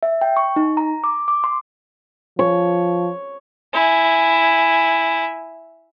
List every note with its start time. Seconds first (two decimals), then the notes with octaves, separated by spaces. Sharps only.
0.03 E5
0.21 G5
0.37 C#6
0.56 D#4
0.77 A#5
1.04 D6
1.28 D6
1.44 C6
2.39 F3 C#5
3.73 E4 G#5